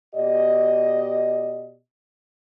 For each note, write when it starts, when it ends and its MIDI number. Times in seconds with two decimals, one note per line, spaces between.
0.15 1.76 47
0.15 1.76 67
0.15 1.76 74
0.15 1.76 75